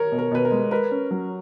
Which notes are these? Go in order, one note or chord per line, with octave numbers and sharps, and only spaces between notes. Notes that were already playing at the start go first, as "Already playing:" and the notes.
Already playing: A#4 C#5
B2
A#4
B2 B4
A#4
G#3
A#4 B4
C#4
F#3